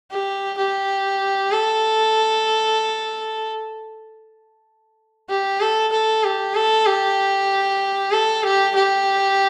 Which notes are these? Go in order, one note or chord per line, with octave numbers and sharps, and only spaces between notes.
G4
G4
A4
G4
A4
A4
G4
A4
G4
A4
G4
G4